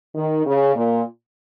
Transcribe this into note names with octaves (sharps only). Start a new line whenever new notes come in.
D#3
C#3
A#2